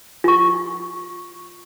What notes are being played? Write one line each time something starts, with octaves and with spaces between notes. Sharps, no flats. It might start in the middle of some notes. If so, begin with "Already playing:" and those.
F4 C#6